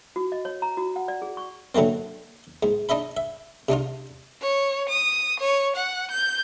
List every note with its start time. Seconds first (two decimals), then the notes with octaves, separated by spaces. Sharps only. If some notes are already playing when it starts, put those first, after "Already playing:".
0.16 F#4
0.32 D#5
0.45 C#5
0.62 A#5
0.77 F#4
0.96 F#5
1.08 D5
1.22 G#4
1.37 C#6
1.75 D3 F#3 A3 A#3 C4
2.63 G#2
2.89 D4 D#4 D#5 E5 B5
3.17 E5
3.69 C3 D4 D#4 F4
4.42 C#5
4.89 D#6
5.40 C#5
5.76 F#5
6.11 G6